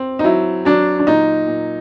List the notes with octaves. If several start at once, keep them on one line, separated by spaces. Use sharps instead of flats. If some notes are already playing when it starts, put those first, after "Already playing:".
Already playing: C4
D#4
F#3 E4
F#3 D4
D4
A#2 D#4
A#2